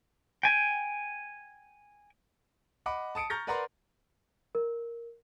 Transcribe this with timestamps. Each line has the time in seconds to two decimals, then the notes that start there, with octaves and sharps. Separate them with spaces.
0.43 G5 G#5
2.86 D#5 F#5 B5 D6
3.15 A5 D#6 C#7 D7
3.30 A#5 C#6 F6 G6 A6 A#6
3.47 A#4 B4 D5 F#5 A#5 C6
4.55 A#4